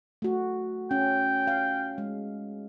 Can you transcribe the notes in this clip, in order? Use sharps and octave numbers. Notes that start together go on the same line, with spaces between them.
A3 F#4
C#4 G5
F5
G#3